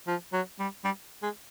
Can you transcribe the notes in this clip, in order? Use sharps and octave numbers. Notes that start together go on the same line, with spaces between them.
F3
F#3
G3
G3
G#3